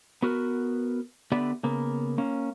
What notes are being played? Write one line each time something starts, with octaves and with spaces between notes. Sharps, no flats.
B3 F#4 A#4 B4
D3 B3 G4 B4 D5 E5
C#3 A#3 B3
A#3 C#4